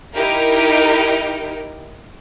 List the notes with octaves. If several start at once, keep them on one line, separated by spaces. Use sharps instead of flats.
D#4 E4 G4 A#4